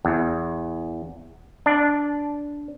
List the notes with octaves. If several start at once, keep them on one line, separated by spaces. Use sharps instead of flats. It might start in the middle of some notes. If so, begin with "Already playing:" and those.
E2
D4